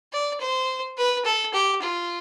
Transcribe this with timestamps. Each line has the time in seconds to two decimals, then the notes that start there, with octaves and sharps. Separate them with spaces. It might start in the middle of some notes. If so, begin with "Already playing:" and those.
0.13 D5
0.41 C5
0.97 B4
1.25 A4
1.54 G4
1.82 F4